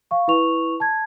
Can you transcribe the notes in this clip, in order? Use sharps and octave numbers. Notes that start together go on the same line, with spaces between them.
F5 C#6
E4 B4 C#6 F7
A5 G#6